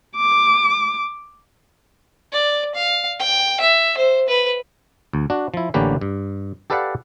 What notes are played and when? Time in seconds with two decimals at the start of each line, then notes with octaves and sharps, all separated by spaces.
0.17 D6
2.32 D5
2.75 F5
3.19 G5
3.60 E5
3.97 C5
4.28 B4
5.13 D2
5.30 D4 F#4
5.54 F3 E4
5.74 A1 D3 A#3 C#4 G4 B4
6.01 G2
6.70 G4 A4 B4 D5 F5 F#5